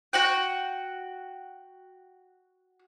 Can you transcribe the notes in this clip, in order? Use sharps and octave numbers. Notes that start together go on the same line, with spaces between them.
F#4 F#5 G5